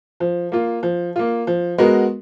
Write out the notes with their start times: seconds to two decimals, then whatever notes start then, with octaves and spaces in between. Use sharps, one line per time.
0.20 F3
0.52 A#3 F4
0.83 F3
1.16 A#3 F4
1.47 F3
1.78 G#3 B3 F#4 A#4